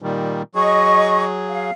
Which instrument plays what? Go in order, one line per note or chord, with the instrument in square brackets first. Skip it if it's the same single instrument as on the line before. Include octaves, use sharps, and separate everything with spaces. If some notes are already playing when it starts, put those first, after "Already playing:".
[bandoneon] A#2 D#3 G3
[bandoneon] F#3 G#4 [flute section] D#5 C#6
[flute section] F5